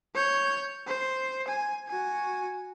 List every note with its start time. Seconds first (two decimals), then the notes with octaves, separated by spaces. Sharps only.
0.15 C#5 G6
0.87 C5
1.48 G#5
1.88 F#4 G#5